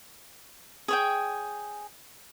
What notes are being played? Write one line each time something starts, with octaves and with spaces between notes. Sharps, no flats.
G#4 C#5 G5